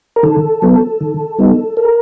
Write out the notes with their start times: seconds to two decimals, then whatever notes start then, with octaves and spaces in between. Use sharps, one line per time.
0.16 A#4
0.23 D#3 A4
0.62 F#3 B3
1.01 D#3
1.38 G3 B3 D#4
1.77 A#4